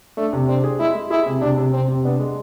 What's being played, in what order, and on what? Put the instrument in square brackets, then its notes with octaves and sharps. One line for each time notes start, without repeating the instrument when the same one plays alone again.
[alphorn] A3 [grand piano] D4
[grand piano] C3
[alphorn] C4 [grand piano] D4
[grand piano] G#4
[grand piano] G#3 [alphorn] E4
[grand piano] G#3
[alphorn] E4 [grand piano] G#4
[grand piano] C3
[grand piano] C3 [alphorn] D4
[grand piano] C3
[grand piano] C3 [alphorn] C4
[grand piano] C3
[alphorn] B3 [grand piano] D4
[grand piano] G#3